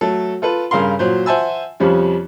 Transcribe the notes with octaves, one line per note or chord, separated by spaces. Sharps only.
F#3 A3 A4
F4 A4 B4
G2 C#3 A#4 F5 C6
A#2 F#3 C5
C5 E5 F#5 G#5 A5 E6
F2 C3 F3 G3 C#4